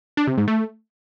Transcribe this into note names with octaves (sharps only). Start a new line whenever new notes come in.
D4
C3
G#2
A3